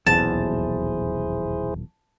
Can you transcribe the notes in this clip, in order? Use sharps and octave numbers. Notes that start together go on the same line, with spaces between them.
D#1 B1 E2 E4 G#4 C5 A5